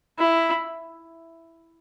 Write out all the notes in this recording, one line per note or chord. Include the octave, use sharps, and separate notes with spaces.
E4